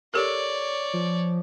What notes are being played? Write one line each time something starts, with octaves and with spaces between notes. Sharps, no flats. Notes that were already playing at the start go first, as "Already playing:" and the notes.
G4 A4 A#4 C#5 D5
F3